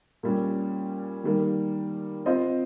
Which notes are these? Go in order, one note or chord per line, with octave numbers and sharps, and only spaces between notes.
A#2 G3 C#4
D#3 G3 A#3
C4 F4 C5 D#5